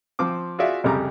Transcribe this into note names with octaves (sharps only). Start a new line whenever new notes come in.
F3 C4 D6
F4 F#4 G#4 D5 E5
C2 F2 C#3 G3 A#5 D6